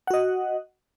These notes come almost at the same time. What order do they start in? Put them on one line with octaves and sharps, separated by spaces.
F#5 F#4 D#5